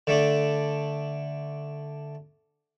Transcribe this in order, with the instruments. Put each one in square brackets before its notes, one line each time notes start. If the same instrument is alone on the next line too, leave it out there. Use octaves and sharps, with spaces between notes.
[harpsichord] D3 A3 D4